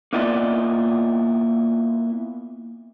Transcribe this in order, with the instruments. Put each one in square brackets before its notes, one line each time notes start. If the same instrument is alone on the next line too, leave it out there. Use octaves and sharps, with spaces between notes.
[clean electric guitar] A#3 B3 E4 F4 D5 D#5